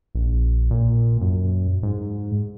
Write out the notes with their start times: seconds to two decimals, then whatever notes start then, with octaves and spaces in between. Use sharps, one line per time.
0.15 A#1
0.71 A#2
1.21 F#2
1.83 G#2